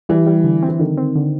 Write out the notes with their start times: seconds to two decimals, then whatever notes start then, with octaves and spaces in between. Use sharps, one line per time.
0.09 E3 G3
0.27 G3
0.44 D3
0.63 C4
0.69 E3
0.80 D3 D#3
0.97 C4
1.16 D3